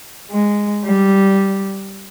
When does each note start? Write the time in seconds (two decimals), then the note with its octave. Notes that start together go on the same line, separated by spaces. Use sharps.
0.31 G#3
0.85 G3